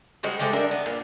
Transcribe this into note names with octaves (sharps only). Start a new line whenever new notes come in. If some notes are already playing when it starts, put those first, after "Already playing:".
G3 G#3 F#4 C5
G#3 A3 C4 G4
G3 D4 A#4 E5
B3
A#2